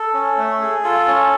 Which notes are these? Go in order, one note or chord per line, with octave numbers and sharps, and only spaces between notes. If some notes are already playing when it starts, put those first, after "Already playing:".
Already playing: A4
C#4
A3
G#4
F4 A4
C#4